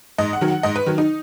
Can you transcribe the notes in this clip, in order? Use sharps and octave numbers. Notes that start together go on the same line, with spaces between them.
G#2 D#5
F#5
D#3 F#3
F#5
G#2 D#5
B4
D#3 F#3
D#4